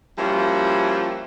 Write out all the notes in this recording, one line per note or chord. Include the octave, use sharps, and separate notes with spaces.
F3 G3 A#3 C#4 E4 F#4